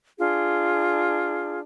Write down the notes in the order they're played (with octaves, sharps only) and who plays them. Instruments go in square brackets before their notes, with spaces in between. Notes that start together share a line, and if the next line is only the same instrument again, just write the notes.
[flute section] D4 F4 G#4